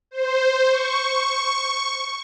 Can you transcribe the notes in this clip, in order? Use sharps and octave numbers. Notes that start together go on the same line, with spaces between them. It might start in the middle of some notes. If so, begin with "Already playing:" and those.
C5
C#6